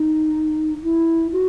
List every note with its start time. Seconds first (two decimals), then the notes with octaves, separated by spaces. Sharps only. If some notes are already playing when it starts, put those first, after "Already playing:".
Already playing: D#4
0.83 E4
1.32 F#4